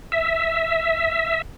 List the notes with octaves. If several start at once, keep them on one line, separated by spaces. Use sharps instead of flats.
E5